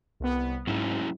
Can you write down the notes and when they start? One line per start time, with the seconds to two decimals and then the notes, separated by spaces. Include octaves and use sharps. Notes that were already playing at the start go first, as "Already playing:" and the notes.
0.20 C2 B3
0.67 G#2 F#3 C#4 E4